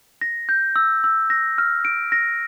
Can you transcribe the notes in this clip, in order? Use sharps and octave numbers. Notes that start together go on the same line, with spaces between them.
A#6
G6
E6
E6
A#6
F6
D7
A#6